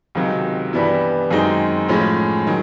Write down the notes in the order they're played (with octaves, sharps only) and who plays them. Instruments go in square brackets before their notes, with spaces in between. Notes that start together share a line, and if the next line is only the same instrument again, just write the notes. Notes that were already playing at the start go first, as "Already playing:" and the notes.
[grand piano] C#2 C3 D#3 F#3
G2 E3 G3 B3 E4
F#2 D#3 G#3 C4 D#4
A2 F3 G#3 C#4
D#3 F#3